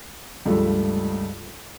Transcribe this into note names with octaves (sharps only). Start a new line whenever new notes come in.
C#2 G2 F3 A3